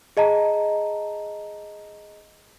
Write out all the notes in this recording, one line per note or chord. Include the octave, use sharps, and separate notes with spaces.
G#4 D#5 A5 A#5